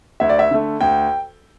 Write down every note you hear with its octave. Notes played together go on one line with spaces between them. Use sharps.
D2 E5
D5
E5
D3 A3
D2 G5